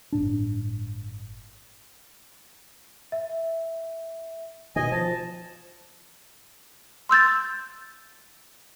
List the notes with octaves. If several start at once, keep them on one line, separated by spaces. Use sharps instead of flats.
G1 A2 D4
E5
B2 D#3 D#5 G#5
F3 A5
C6 E6 G6 A6